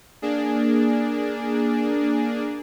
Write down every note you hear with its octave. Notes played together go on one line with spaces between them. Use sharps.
A#3 D4 G#4